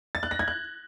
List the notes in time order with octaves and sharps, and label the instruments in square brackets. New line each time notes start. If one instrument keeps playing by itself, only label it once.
[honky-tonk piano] A6
F#6
A#6
G#6
F#6